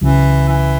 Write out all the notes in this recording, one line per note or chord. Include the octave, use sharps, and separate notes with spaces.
C#2 C#3 E3 F#3
E3